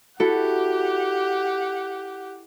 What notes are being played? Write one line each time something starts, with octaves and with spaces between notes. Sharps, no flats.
E4 F#4 G4 A4 F#5